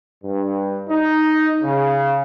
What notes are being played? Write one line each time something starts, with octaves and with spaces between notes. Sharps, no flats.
G2
D#4
C#3